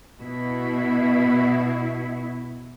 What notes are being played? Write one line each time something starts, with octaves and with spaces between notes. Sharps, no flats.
B2 E4